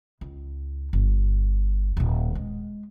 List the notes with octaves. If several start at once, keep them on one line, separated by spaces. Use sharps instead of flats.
C#2
G1
D#1 A#2
G#3